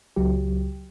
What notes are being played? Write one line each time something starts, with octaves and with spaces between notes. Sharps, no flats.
C#2 F#3 G4